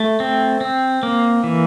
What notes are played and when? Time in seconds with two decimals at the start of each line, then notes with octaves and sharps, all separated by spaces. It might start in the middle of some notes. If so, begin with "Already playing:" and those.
Already playing: A3
0.20 C4
0.61 C4
1.03 A#3
1.44 E3